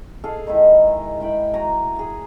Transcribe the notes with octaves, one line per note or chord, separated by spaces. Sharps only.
G#4 A4 F5
D#3 G#3 D#4 E4
G#3 E4 G5 B5
F#4 G#5 A#5
G#4 F5